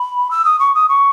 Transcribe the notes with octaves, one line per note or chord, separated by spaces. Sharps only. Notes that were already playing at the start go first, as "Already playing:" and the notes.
Already playing: B5
E6
D#6
C#6
D#6
C#6